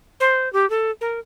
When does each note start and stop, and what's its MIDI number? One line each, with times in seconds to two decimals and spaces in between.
0.20 0.51 72
0.53 0.68 67
0.70 0.91 69
1.01 1.19 70